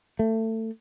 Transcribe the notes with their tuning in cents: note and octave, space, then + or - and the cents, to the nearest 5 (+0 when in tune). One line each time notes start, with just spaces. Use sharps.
A3 +25